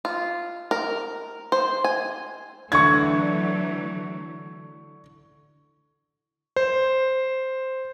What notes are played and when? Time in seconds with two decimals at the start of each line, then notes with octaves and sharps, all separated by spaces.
0.05 F4
0.71 A#4
1.52 C5
1.84 G#5
2.72 D3 E3 F#3 A3 E4 F#4 C#6 G#6
6.56 C5